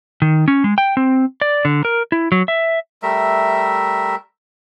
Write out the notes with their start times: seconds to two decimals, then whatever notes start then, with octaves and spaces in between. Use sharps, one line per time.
0.22 D#3
0.48 C#4
0.64 G#3
0.78 G5
0.97 C4
1.42 D5
1.65 D3
1.85 A#4
2.12 E4
2.32 F#3
2.48 E5
3.03 G3 A3 A#4 E5